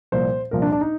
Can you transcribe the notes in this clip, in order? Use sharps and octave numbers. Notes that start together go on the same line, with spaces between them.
C2 A#2 F3 C5
C2 A#2 F3 A#4
D4
D4
D#4